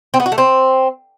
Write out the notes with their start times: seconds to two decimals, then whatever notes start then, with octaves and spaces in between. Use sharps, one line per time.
0.14 C4
0.20 B3
0.26 F#4
0.32 A3
0.38 C4